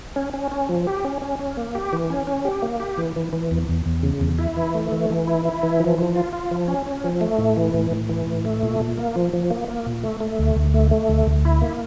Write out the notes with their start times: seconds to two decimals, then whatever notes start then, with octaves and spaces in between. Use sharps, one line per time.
0.16 C#4
0.34 C#4
0.51 C#4
0.69 F3
0.87 G4
1.05 C#4
1.22 C#4
1.39 C#4
1.57 A#3
1.75 G4
1.93 E3
2.10 C#4
2.27 C#4
2.45 G4
2.62 A#3
2.80 G4
2.98 E3
3.16 E3
3.33 E3
3.51 E2
3.68 E2
3.86 E2
4.03 C#3
4.21 E2
4.39 E4
4.57 E3
4.74 A3
4.92 E3
5.10 E3
5.27 E4
5.45 E4
5.63 E3
5.80 F3
5.98 F3
6.16 F4
6.33 F4
6.51 F3
6.68 C#4
6.86 C#4
7.04 F3
7.21 A3
7.38 A2
7.57 E3
7.74 A2
7.91 A2
8.09 E3
8.27 A2
8.45 A3
8.63 A#2
8.80 A#2
8.97 A#3
9.16 F3
9.33 F3
9.50 A#3
9.68 A#3
9.86 A#2
10.04 A3
10.21 A3
10.39 D2
10.56 D2
10.74 A3
10.91 A3
11.09 D2
11.27 D2
11.45 E4
11.62 A#3